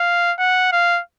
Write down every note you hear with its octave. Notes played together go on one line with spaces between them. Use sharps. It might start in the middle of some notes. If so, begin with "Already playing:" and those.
Already playing: F5
F#5
F5